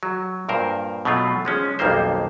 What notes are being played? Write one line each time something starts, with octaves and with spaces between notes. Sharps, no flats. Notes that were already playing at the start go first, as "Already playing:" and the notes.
F#3
G2 A#2 A#4 C5
B2 F#3 A3 F4
F3 G#3 C#4
B1 F2 D#3 G3 A#3 C5